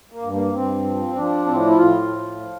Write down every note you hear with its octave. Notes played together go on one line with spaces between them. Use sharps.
A#3
G2
A#3
G2 C4
F3
F3 D4
A2 C4
D4
E4
A2 F4
F3
F3